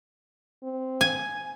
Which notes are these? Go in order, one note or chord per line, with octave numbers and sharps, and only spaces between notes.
C4
G#5